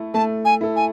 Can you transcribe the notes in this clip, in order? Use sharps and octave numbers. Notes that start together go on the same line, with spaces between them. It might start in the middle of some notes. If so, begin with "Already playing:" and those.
Already playing: A3 E4 A4
A3 A5
G#5
E4 A4
G#5